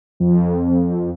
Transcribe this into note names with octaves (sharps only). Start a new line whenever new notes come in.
F2